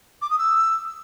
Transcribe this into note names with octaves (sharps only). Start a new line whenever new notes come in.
D6
D#6
E6